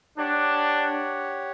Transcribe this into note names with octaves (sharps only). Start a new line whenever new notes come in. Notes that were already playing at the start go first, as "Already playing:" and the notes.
D4 G4 C#5 F#5